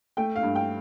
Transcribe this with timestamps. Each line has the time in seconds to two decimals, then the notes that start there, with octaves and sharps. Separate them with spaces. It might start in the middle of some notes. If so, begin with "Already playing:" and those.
0.17 A3 G5
0.36 F5
0.43 G2
0.55 G5